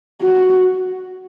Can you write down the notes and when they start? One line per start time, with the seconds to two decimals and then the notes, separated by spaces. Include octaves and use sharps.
0.22 F#4